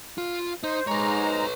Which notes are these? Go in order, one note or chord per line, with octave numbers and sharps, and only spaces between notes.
F4
D#4 C5
G#2 G#3 B4 C#5 A#5